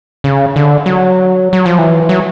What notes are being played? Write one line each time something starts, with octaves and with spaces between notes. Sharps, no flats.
C#3
D3
F#3
F#3
F3
E3
F#3